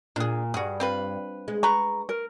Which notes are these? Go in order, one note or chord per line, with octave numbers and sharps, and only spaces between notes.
A#2 D4 G#4
G2 F#4 G#4
C4 F4 B4
G#3
B4 A#5 C#6
A#4